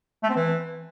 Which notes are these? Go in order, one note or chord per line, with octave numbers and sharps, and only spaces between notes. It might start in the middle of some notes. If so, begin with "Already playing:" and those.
A3
C4
E3